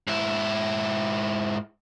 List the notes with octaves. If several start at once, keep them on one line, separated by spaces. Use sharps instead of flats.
G#2 E4